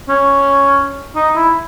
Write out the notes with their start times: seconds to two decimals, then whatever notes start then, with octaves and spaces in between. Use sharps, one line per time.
0.09 C#4
1.15 D#4
1.36 E4